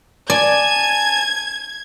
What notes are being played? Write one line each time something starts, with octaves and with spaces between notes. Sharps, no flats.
D5 G#5 A5 G#6